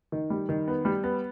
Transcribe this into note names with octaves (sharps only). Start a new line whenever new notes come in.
D#3
G3
D#3
B3
G3
B3